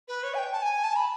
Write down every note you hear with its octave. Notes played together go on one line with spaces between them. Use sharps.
B4
C#5
G#5
G5
A5
G#5
A5
B5